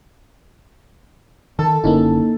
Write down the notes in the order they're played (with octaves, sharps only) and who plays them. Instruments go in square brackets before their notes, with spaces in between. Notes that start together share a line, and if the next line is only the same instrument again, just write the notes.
[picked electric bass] D#3 [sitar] A4
[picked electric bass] F#1 D3 C#4 [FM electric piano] A#3 D#4 E4